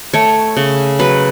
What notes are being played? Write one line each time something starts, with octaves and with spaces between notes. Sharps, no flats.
A3 C#5
C#3
F#3 B4